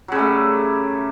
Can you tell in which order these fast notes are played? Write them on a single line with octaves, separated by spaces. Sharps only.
F#3 C#3 G3 A3